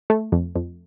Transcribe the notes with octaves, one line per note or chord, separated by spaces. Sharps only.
A3
F2
F2